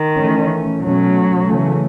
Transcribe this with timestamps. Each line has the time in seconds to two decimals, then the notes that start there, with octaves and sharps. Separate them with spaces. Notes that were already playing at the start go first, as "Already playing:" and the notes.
Already playing: D#3
0.18 E3 A3 C#4
0.81 B2 F#3 A3 C#4
1.44 C#3 E3 A3 C#4